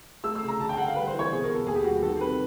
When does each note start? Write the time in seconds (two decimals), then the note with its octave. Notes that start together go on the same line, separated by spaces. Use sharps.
0.24 A3 E6
0.35 E6
0.41 C#3
0.48 A#5
0.60 D3 A5
0.69 G5
0.78 D3 F#5
0.87 F5
0.96 G3 B4
1.07 C5
1.14 E3
1.19 C#5
1.31 B2 G#4
1.44 A#4
1.49 B3
1.55 A4
1.66 D#2 G#4
1.75 G4
1.84 G3 F#4
2.02 D#3 A4
2.20 C3 B4